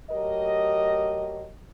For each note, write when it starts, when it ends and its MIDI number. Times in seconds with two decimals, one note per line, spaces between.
0.11 1.48 54
0.11 1.48 57
0.11 1.48 67
0.11 1.48 70
0.11 1.48 75